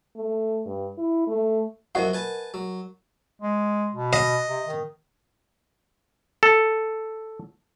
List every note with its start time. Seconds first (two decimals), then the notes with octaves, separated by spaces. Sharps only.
0.17 A3
0.66 G2
0.98 E4
1.27 A3
1.95 F#2 F3 F#4 A#4 D#5 F#5
2.13 B4 G#5 A5
2.54 F#3
3.42 G#3
3.94 B2
4.13 D#5
4.49 C3
4.67 D#3
6.43 A4